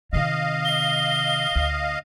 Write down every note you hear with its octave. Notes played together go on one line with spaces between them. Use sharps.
C3 D#3 D#5 F5
G7
D2